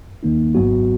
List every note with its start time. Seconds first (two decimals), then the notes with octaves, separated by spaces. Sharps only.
0.23 D#2 D#3 A#3 D#4
0.55 G#1 G#2 F#3 B3 F#4